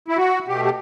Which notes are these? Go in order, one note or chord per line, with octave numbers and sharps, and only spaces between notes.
E4
F#4
B2 A3 G4
G4